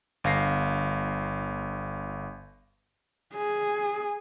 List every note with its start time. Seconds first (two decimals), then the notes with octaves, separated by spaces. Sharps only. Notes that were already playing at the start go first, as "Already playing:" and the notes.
0.24 G1 F5 A#6 C7
3.35 G#4